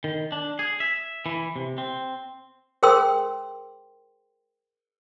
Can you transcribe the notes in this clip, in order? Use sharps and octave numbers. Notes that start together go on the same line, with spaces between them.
D#3
D4
G#4
E5
E3
C3
C4
G#4 A#4 C5 G5 C6 E6